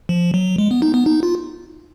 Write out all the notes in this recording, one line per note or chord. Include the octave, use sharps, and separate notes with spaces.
F3
F#3
G#3
B3
D#4
B3
D#4
F4